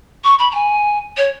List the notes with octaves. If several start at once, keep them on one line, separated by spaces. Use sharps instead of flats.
C#6
B5
A#5
G#5
C#5